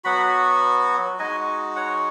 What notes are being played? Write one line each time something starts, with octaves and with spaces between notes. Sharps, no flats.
F#3 B3 F#4 F#5 B5
G#3 D#4 F#4 D#5 G#5
C#5 F#5